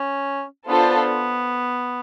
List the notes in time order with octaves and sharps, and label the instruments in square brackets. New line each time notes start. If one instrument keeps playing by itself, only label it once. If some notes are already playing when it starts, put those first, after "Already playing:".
Already playing: [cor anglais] C#4
[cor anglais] B3 [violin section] D4 F4 A4 C5